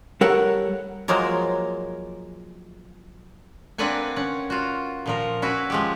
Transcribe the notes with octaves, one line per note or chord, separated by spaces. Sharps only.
G3 A4 A#4 C#5 F#5
F3 F#3 G#3 A#3 A#4
A#3 C4 D4 B4 F#5 G#5
C#4 F#5
F4 F#4
A#2 F3 A#4
C#4 E4 F#4 B4
F3 G#3 G4